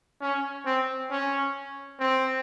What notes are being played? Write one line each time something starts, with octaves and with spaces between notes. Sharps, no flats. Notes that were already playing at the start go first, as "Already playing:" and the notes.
C#4
C4
C#4
C4